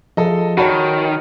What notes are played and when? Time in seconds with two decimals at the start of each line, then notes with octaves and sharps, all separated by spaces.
0.17 F3 F4 G#4 A4 D#5
0.58 D#3 F#4 C#5 A5 B5